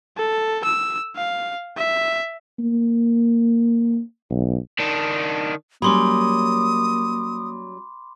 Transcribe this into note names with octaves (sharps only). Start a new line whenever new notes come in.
A4
E6
F5
E5
A#3
B1
D#3 D4
F#3 G3 A#3 C#4 B5 C6 D6 D#6